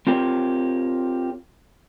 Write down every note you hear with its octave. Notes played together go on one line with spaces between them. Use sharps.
C4 F4 G4 A#4 C#5